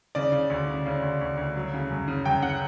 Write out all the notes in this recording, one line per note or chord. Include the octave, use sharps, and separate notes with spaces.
C#3 D5
C#3
D2
C#3
C#3
D2
D2
D2
F#3
C#3
F#2
C#3
F#2 G5
C#3 F#5